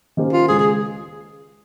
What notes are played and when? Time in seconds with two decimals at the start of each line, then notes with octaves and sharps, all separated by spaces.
0.17 D#3 A#3 C#4 G4 C5
0.33 F4
0.49 C#2 C#3 G#3 G#4
0.60 G#4